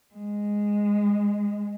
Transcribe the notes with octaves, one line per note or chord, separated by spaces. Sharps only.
G#3